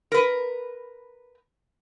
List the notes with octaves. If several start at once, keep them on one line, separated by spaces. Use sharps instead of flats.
A#4 B4